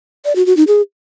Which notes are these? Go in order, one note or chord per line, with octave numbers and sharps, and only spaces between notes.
D5
F#4
F#4
D#4
G#4